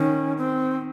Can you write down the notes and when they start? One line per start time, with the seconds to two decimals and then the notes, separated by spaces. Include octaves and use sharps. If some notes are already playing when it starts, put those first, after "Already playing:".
Already playing: D#3 C#4
0.38 C4